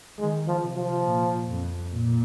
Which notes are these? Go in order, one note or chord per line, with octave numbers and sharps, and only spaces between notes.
D#3 G#3
F3
C3
F3
A#2
F2
A#2